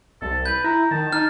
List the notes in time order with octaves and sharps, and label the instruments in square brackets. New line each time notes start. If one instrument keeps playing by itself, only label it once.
[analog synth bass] C2 [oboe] A4
[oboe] B4 [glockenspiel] G6
[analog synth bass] E4 [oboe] A#5
[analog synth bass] D#3 [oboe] A5
[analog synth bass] D#4 [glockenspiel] F6